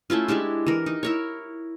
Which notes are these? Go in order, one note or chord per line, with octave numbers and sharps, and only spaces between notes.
A3 C#4 E4 F4
G#3 D4 E4 G4
E3 A#4
D#4
E4 A#4 C#5